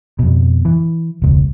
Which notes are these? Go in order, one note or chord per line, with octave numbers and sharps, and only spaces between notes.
F2 B2
E3
E1 C#2